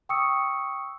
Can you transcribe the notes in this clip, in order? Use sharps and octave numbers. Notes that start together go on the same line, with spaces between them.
G5 C#6 D#6 E6 C#7